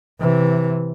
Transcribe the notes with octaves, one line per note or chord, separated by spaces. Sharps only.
C3 E3